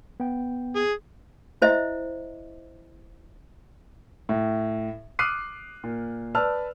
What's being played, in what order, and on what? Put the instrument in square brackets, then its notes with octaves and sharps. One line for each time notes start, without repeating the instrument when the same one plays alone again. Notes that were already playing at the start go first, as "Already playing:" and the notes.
[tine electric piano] B3 G5
[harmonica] G#4
[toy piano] E4 C5 D#5 E5
[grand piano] A2
D6 D#6 F6 F#6 C7 D#7
A#2
B4 D5 A5 E6 F6